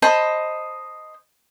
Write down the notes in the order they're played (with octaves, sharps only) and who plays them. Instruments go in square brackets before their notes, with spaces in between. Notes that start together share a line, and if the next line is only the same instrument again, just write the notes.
[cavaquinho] C5 D#5 A5 B5